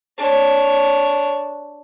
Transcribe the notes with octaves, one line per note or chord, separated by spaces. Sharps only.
D4 C#5